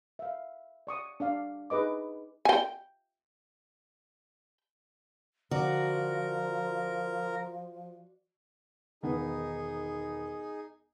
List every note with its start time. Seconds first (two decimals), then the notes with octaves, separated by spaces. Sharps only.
0.19 E5 F5
0.87 D5 C#6 D#6
1.20 D4 D5 F5
1.70 D#4 G#4 B4 D#5 D6
2.45 G5 G#5
5.51 D3 F3 F#4 A#4 D5
9.03 E1 D#3 B3 D#4 G#4